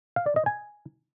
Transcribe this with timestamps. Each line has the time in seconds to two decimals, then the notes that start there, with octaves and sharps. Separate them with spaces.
0.16 F5
0.26 D5
0.36 D#5
0.46 G#5